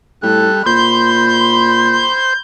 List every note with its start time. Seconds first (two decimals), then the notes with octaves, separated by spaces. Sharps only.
0.23 A2 G3 A4 F#6
0.66 A#2 C5 B5 C6 G6